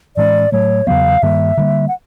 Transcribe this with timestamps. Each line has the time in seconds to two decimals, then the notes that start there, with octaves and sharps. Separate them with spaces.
0.16 A2 E3 G#3 C#4 D5
0.52 A2 F#3 A3 C#5
0.87 E2 C#3 F#3 B3 F5
1.22 G2 D#3 G3 A#3 E5
1.57 D3 G3 A#3
1.88 F#5